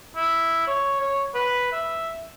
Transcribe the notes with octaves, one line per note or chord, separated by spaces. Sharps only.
E4
C#5
C#5
B4
E5